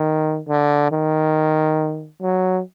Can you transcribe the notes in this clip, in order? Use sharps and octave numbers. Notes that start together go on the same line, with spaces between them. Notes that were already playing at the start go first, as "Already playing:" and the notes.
Already playing: D#3
D3
D#3
F#3